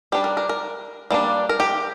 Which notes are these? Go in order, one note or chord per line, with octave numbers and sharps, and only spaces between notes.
G3 D4 G4
A#4
A#4
A#4
G3 A#3 D4
A#4
G4